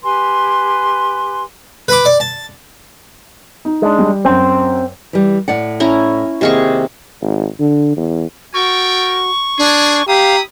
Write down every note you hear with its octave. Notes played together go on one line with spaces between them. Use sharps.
G4 B4 G#5 C6
B4 B5 D6
D5
A5
D#4
G#3 D4
G3
F#2 C4
E3 G3
A2 D5 F#5
C#4 E4 A#5
D#2 C3 G#4 D#5 F5 C#6
G#1
D3
E2
F#4 A4 A#4 G5 C#6
D4 G#4
E4 G4 F5 A#5 B5 D#6